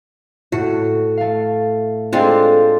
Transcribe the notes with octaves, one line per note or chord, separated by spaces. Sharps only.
A2 F#4
A3 F5
G#3 C4 D4 F4 A4 F5